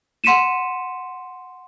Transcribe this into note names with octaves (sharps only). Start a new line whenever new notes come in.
F#5 C6 B6 C#7 D#7 E7